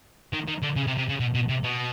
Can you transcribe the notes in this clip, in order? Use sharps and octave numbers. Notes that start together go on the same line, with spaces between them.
D#3
D#3
D3
C#3
C3
C3
C#3
B2
B2
C3
B2